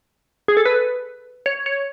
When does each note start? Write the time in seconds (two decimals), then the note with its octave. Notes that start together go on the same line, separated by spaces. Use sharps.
0.48 G#4
0.57 A4
0.65 B4
1.46 C#5
1.66 C#5